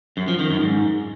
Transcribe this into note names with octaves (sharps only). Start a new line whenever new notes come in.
F#2
F3
D#3
F#2
G#2